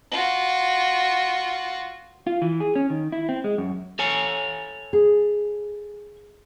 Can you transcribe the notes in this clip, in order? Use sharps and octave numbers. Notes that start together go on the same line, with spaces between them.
F4 F#4
F4
E3
G#4
C#4
D#3
E4
C4
G#3
F#2
A4 C#5 G#5
G#4